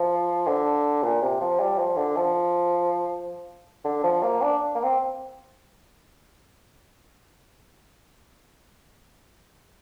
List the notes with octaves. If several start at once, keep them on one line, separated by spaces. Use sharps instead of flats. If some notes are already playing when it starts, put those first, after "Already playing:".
Already playing: F3
D3
A#2
C3
F3
G3
F3
D3
F3
D3
F3
A#3
D4
A#3
C4